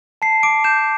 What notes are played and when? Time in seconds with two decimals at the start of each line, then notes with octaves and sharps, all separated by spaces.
0.22 A5 C7
0.43 D6 D7
0.64 G6 E7